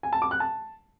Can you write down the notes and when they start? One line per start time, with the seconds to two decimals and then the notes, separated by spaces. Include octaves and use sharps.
0.03 G#5
0.13 A5
0.22 D6
0.31 F#6
0.40 A5